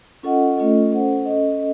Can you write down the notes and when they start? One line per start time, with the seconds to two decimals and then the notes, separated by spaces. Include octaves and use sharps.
0.23 C#4 F4 A4 D#5 F#5
0.57 A3 C#4 F4 A4 D#5
0.91 C#4 A4 C5 F#5
1.26 C#4 A4 D#5